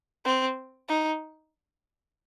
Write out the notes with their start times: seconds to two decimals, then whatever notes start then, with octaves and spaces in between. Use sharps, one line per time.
0.25 C4
0.88 D#4